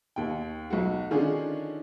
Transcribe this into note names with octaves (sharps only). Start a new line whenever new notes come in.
D#2 G5
B1 F#4
D3 D#3 C#4 D4 F4 G#4